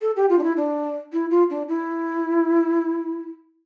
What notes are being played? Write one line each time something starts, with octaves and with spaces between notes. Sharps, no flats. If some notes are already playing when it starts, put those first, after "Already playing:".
A4
G4
F4
D4
E4
D4
E4
F4
D4
E4